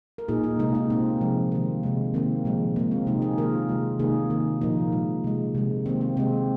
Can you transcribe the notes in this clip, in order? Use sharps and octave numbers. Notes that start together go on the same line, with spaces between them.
A#4
A#2 A#3 D#4 G#4
A#3 D#4
C3 G#3 A#3 D#4
A#3 D#4
A#2 A#3 C4
C3 F3 G#3
D#3 A#3
C3 G#3
D#3 A#3 C4
A#2 F3 G#3
A#2 G#3 A#3
C4
C3 G#3 A#3 D#4
D#4 G#4
D#3 A#3 F4 A#4
C3 G#3
C3 D#3 A#3 D#4 G#4
D#3 A#3
A#2 F3 A#3 D#4
A#2 G#3
C3 G#3
C3 G#3
D#3 A#3 C4
C4
C3 G#3 C4